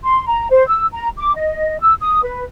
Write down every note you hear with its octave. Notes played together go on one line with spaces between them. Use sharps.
C6
A#5
C5
E6
A#5
D6
D#5
E6
D#6
B4